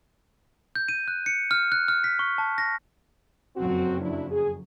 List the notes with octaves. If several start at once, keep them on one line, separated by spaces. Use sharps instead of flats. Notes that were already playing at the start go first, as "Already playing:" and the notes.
G6
D#7
F#6
C#7
F6
F#6
F6
B6
C#6
A5
A#6
F#1 F2 F#3 C4 F#4
D4 E4
G#4